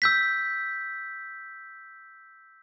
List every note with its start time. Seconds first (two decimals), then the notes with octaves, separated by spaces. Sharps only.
0.02 E6 G6 B6